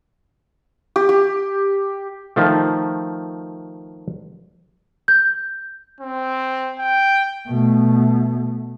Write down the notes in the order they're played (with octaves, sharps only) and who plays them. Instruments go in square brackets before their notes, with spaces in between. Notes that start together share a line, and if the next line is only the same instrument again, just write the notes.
[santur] G4
G4
[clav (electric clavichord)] D#3 F3 A3
[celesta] G6
[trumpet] C4
G5
[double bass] B2 A3